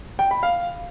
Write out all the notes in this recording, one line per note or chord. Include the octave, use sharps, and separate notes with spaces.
G5
B5
F5